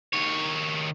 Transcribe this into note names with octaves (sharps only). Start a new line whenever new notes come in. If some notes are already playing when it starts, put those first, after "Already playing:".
D#3 C#5